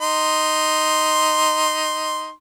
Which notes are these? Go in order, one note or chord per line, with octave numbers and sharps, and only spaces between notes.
D#4 C6